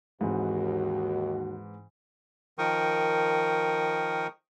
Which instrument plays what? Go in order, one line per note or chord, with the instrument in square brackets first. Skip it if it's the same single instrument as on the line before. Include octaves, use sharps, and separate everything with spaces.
[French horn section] D#2 F#4 [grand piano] G#2 E3 C4
[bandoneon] D#3 F3 A#4 G5 C#6 D#6